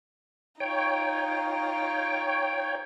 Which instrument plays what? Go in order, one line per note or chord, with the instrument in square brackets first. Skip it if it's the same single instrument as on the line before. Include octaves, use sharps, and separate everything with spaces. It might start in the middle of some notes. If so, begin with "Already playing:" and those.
[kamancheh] D#4 F4 [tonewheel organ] C#5 G5